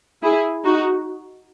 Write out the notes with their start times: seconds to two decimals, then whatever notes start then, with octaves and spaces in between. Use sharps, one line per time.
0.23 E4 G#4
0.64 D#4 F#4